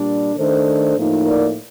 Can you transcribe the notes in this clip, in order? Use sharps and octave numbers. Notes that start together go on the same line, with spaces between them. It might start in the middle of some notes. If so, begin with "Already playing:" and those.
Already playing: A#2 G3 D4
D#3 A3 D4 A4 C5
A2 F3 A#3 D#4
A#4 D5